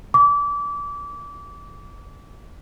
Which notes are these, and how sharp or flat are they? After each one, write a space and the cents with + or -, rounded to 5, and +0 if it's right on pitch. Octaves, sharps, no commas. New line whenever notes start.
D6 -30